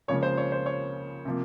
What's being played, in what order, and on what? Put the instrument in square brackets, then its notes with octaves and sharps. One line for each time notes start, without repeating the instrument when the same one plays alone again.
[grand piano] C#2 C#3 F3 A#3 C#5
C5
C#5
C5
C#5
C3 F3 A#3